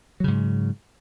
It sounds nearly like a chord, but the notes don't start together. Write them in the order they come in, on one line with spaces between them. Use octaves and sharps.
F#3 C#3 G#2